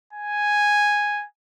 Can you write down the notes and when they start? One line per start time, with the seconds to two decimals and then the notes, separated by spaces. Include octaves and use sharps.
0.13 G#5